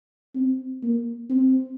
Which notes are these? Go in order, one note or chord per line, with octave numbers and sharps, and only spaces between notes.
C4
A#3
C4